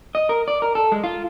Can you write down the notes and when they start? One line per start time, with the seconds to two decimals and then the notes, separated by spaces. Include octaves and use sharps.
0.15 D#5
0.29 A#4
0.48 D5
0.62 A#4
0.75 A4
0.92 G#3
1.04 F4